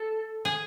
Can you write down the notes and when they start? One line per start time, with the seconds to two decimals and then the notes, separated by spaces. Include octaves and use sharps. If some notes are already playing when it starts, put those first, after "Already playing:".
Already playing: A4
0.45 G#4